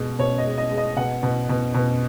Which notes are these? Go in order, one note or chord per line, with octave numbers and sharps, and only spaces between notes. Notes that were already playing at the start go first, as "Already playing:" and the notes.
Already playing: B2 G#3
B2 C#5
D#5
G#3
D#5
G#3
D#5
B2 F#5
B2
B2
B2